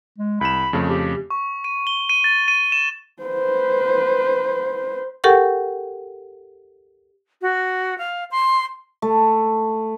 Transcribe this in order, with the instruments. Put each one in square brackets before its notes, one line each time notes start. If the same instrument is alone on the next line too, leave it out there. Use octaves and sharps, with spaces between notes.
[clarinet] G#3
[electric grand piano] C2 E7 [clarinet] B5
[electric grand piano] F2 C#3 A3
[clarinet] G4
[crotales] C#6
D#7
G7
D#7
A6
D#7
E7
[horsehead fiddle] B4 C5
[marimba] G4 A4 A#4 F#5 G5 C#6
[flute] F#4
F5
C6
[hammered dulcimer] A3